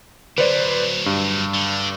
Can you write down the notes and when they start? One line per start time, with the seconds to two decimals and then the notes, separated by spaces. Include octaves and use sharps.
0.38 D3 F#3 B4 C5 D5
1.06 G2
1.54 D3